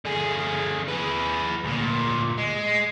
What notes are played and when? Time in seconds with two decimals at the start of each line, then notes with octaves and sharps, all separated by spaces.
0.05 D3 G#4
0.88 G#4 B4
1.64 D2 A#2
2.39 G#3